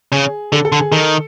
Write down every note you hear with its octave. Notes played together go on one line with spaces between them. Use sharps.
C#3 G#4
D3 A4
A4
D3
G#4
D#3 A4